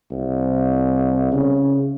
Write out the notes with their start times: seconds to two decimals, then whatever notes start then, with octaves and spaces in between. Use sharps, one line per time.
0.11 C2
1.32 C#3